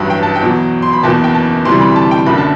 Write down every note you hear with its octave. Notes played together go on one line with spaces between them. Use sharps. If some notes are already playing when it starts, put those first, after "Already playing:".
Already playing: A1 G2 F#3 A5
G5
A5
G5
E2 B2 F#3
C6
B5
F#1 E2 B2 A5
G5
A5
D2 C3 E3 G3 C6
B5
A5
G5
F#1 F#2 D3 B5
A5